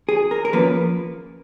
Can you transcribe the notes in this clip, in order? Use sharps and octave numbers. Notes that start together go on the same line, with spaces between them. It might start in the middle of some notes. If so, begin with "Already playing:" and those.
G#4
A#4
A#4
F3 A#3 C#4 B4